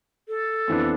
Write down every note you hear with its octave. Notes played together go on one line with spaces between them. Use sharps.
A4
F2 E3 B3 D4